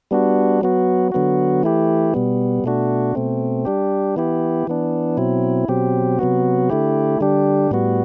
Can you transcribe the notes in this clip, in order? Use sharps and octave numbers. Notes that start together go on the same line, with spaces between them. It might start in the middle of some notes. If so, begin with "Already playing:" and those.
G3 B3 D4 F#4
F#3 B3 F#4
D3 F#3 B3 F#4
E3 A3 E4 G4
B2 G3 B3
B2 A3 D4 F#4
B2 A3 C4
G3 D4 G4
E3 B3 E4 G4
E3 B3 D4
B2 F#3 C4 E4
B2 F#3 C4 G4
C3 F#3 B3 F#4
D3 A3 E4 G4
D3 G3 D4 G4
A2 G3 B3 F#4